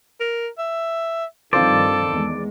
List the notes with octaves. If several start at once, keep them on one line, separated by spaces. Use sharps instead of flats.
A#4
E5
G2 D#3 F3 C4 F4 A4 C5 D5
E2 G#3